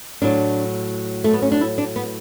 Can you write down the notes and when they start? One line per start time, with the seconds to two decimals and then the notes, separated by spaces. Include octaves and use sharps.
0.22 A2 F#3 D4
1.24 A3
1.33 B3
1.42 C#4
1.52 D4
1.61 E4
1.78 D4
1.96 B3